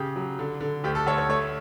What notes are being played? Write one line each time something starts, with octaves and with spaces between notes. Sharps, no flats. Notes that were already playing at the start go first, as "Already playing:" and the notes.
Already playing: C#3 G4
F#3
D3
D3
D2 G4
A4
D2 C#5
C#5
A3 C#5